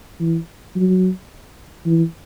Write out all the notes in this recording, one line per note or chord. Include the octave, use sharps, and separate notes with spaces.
E3
F#3
E3